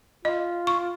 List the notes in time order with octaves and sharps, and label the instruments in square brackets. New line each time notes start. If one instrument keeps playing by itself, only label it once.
[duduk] F4 [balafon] D#5
[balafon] C#6